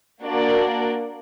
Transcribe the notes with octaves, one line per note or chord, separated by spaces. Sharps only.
A#3 D4 F#4 A#4 D5